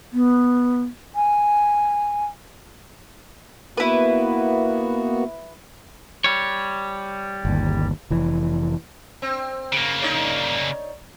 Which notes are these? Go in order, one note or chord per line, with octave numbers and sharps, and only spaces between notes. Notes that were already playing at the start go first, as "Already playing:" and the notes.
B3
G#5
A#3 B3 E4 F#4 B4
G3 C#5
G1 D#2
F1 E3
C4
C#3 A#3
D#4 C#5 D5